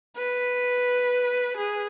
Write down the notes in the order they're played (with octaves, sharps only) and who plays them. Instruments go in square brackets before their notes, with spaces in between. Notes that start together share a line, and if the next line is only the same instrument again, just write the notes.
[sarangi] B4
G#4